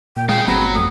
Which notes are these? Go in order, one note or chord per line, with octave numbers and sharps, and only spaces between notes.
A#2 G5
G#3 G#4 F5 G5
G1 D2 F#3 B3 C4 B5
F2 A3 D#6